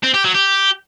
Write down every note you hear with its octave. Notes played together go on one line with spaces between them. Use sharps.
C4
G4
F#3
G4